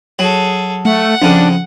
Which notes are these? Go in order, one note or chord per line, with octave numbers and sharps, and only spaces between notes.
F#3 G#4 A4
A3 F#5
F2 C#3 D4